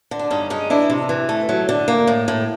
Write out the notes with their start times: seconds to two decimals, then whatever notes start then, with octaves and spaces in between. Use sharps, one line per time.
0.11 D3
0.19 D4
0.30 G2 C#4 D#4
0.50 G#3 C#4 D#4
0.70 E3 D4 E4
0.90 C3
1.09 E3
1.29 A3
1.49 F#3
1.69 D3
1.88 A#3
2.07 A2
2.28 A2